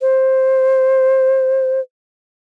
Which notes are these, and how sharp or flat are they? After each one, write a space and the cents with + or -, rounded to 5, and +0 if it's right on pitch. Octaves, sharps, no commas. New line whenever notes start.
C5 +10